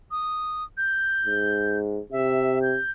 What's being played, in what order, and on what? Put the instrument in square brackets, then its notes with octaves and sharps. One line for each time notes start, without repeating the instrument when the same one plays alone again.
[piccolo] D#6
G6
[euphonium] G#2
[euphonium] C3 [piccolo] E5
[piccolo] G6